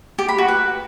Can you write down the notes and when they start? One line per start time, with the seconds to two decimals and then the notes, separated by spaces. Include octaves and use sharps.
0.19 G4
0.28 B5
0.38 F#4
0.48 B4